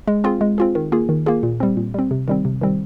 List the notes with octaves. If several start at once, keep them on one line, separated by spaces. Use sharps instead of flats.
G#3
C4 F4 G#4
G#3
C4 F4 G#4
D#3
A#3 F4 G#4
D#3
A#3 F4 G#4
A#2
G3 C4
A#2
G3 C4
C3
D#3 G3 C4
C3
D#3 G3 C4